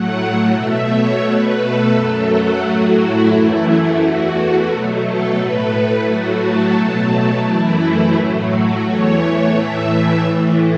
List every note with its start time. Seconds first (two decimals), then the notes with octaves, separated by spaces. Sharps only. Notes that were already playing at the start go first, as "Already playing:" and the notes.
Already playing: A2 F#3 A3 F#5
0.19 F#5
0.53 B2 A3 E5
0.87 C#5
1.22 B2 A3 B4
1.57 A4
1.91 F#2 F#3 A3 A4
2.25 F#4
2.59 A2 F#3 A3
2.94 E4
3.28 F#2 E3 A3 E4
3.63 E4
3.97 E2 E3 A3 F#4
4.67 B2 F#3 A3
5.02 A4
5.36 A2 A3 B4
5.69 B4
6.04 A2 F#3 A3 F#4
6.39 A4
6.73 B2 F#3 A3
7.42 F#2 E3 A3 E4
8.11 A2 F#3 A3
8.46 F#4
8.80 E2 E3 A3 C#5
9.15 C#5
9.49 A2 E3 A3 E5
10.17 A2 E3 A3